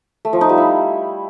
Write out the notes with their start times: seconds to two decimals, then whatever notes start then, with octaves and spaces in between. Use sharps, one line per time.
0.25 A3
0.33 F3
0.41 D#4
0.49 G3
0.58 E4